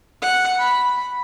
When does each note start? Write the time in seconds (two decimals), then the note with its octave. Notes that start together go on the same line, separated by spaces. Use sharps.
0.22 F#5
0.59 B5